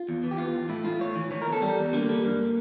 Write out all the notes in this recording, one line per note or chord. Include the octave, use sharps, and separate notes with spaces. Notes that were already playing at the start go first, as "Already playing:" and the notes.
Already playing: F4
E2
E3
G4
E2 F4
E3
A2 E4
A2 F4
A2 C#5
E3
E3 C#5
A#4
E2
A4
G3 G4
E2
D3 A#3
G3
G2